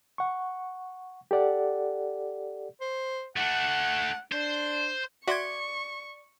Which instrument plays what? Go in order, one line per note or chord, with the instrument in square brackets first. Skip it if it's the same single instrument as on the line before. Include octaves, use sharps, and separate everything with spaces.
[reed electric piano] F#5 C#6
G4 A4 D5 F#5
[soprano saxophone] C5
[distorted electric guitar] A3 D4 [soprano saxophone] F#5
[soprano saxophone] D4 [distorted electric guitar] C5
[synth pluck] F#4 [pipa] D5 [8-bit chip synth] E5 C6 G#6 [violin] C#6